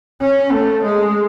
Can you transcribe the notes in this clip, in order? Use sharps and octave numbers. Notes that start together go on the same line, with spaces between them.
C#4
A3
G#3